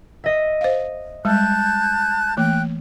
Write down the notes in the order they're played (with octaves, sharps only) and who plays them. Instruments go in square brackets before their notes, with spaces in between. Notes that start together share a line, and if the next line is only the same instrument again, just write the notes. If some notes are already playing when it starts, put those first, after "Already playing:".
[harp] D#5 E5
[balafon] C5 F5
[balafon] G3 G#3 [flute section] A5 F#6 G6
[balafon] E3 A3 A#3 [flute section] G5 F#6